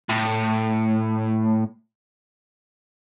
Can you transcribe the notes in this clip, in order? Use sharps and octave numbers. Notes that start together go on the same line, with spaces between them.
A2